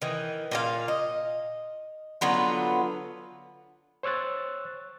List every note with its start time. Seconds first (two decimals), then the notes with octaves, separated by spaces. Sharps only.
0.02 D#3 E3
0.51 A#2 G4 F5
0.88 D#5
2.21 D3 F#3 B3 F4
4.03 C5 C#5 E6 F#6 A6